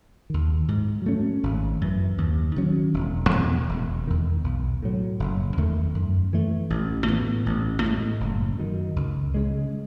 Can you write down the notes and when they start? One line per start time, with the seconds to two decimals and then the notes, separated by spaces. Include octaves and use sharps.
0.30 D#2 D#3
0.68 G#2
1.06 F#3 A3 C#4
1.43 G#1
1.81 F#2 E3
2.18 D#2
2.56 D#3 F#3 C#4
2.94 E1
3.31 E2 B2 A3
3.69 E1
4.07 E2 D#3
4.44 B1
4.82 A2 F#3
5.20 F#1
5.57 E2 D#3 A3
5.95 F#2
6.33 E3 A3
6.70 A1
7.08 A2 E3 B3
7.46 A1
7.84 A2 G#3
8.20 F#1
8.59 F#2 D#3
8.96 C#2
9.34 C#3 G#3